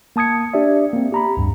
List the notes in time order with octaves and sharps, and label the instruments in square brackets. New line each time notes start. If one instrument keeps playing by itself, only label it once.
[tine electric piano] A#3 A5 D#6 G#6 C#7
D4 G4 D5 E5
A#3 C4
G4 A#5 B5
D2 G2